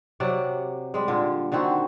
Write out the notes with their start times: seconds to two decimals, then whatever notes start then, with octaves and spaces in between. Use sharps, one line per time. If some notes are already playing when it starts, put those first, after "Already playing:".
0.20 C3 F#3 D5 F#5
0.94 G3 G#3
1.08 A#2 D3
1.52 D3 D#3 C4 F#4